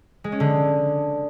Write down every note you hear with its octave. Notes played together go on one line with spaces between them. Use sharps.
G#3
C#4
D3